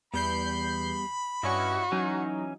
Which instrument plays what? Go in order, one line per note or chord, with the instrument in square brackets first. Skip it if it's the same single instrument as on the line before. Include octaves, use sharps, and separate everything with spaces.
[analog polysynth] E2 G6 C7 [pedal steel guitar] G3 B3 [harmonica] B5
[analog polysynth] G2 C#4 C#6 [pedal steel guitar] E4 D#5 [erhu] F#4
[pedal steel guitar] E3 C#4 [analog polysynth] F#3 D#4